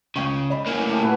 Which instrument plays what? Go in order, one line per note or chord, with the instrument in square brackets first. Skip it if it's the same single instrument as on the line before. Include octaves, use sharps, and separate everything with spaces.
[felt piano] C#2 G5 C#6 [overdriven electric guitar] C#3
[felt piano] D5 D#5 B5
[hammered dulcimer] A2 G#5 [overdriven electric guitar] A#3 C#4
[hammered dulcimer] A3 G4
[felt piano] A#2 [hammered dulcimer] E4 F#4 B4